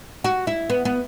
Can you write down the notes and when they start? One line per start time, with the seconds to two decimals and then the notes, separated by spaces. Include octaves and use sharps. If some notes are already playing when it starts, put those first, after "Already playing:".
0.24 F#4
0.47 E4
0.70 B3
0.85 B3